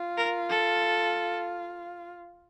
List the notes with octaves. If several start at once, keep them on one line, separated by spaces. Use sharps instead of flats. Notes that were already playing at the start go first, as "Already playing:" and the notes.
Already playing: F4
A#4
A4